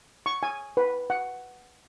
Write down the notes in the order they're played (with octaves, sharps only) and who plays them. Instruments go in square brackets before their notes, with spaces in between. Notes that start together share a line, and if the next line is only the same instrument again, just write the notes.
[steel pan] C#6
G#5
B4
F#5